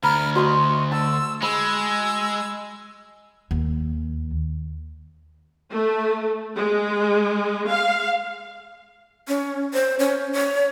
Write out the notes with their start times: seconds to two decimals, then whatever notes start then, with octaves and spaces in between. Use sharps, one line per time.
0.03 D2 A#5 B5 F6
0.36 F#4 D#5 C6 C#6
0.92 A5 E6
1.43 G#3 B5 E6
3.51 D#2
5.71 A3
6.56 G#3
7.68 F5
9.28 C#4
9.74 C5
9.99 C#4
10.33 C#5